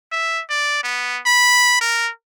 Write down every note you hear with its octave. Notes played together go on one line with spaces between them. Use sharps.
E5
D5
B3
B5
A#4